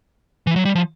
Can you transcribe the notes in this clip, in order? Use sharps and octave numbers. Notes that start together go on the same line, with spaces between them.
E3
F#3
G3
F3